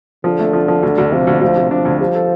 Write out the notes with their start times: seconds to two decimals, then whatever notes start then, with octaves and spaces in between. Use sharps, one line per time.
0.24 D3 F3
0.39 A3
0.53 F3
0.68 F3
0.83 D2
0.98 D2
1.12 C3 F3
1.27 D2
1.41 D2 F3
1.56 C3
1.71 F3 D4
1.85 D2
2.00 F3 G3
2.15 A4